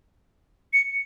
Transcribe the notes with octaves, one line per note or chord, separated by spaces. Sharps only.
C#7